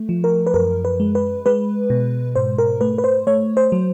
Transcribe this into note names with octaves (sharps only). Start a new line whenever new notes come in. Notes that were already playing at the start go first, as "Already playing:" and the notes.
Already playing: A3
F3
A#4
B4
F#2 A#4
B4
G#3
B4
G#3 B4
B2
G#2 C5
A#4
A3 B4
B4
C5
A3 C#5
C5
F#3